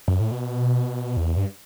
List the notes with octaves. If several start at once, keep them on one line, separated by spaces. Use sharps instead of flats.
F#2
A2
B2
E2
G2